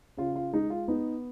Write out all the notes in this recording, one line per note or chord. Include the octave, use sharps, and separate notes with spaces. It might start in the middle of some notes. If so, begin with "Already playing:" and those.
C#3 F4
F4
G#3 D#4
F4
B3 D#4